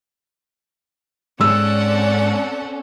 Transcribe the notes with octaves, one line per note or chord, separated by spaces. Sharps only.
G#2 G#3 C4 C#4 A4 D5 F#5 E6